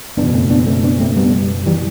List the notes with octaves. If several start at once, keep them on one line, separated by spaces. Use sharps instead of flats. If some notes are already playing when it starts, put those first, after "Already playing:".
F#1 E2 B2 B3 D4
A3 C4
B3 D4
A3 C4
B3 D4
A3 C4
G3 B3
E3 G3